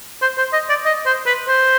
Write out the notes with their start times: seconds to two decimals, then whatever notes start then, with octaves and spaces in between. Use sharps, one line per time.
0.22 C5
0.38 C5
0.53 D#5
0.69 D5
0.85 D#5
1.06 C5
1.26 B4
1.48 C5